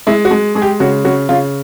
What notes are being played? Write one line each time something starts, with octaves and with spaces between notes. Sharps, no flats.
G#3 E4
F#4
G#3
G#3 G#4
G4
C#3 F#4
C#3 F#4
C#3 F4